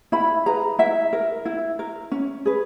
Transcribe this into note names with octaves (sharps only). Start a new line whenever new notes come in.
E4 B5
G#4 B4 A#5
E4 E5
A#4
E4
A#4
C#4
G#4 B4